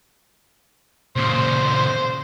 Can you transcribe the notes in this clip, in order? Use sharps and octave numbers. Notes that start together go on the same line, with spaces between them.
A#2 C#3 C5